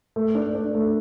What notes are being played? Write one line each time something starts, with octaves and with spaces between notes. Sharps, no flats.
A3
D4
D4
A3